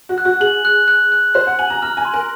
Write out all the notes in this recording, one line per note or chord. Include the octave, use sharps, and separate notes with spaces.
F#4
F#6
F#4
G#4 F#7
F#6
F#6
F#6
C5 F#6
F#5
G#5 F#7
A#5
A#5 F6
G#5
C6
A#4